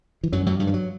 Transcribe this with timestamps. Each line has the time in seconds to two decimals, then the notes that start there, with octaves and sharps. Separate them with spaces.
0.23 E3
0.32 F#2 F#3
0.46 F#2 F#3
0.60 G2 G3
0.67 E3
0.74 F#3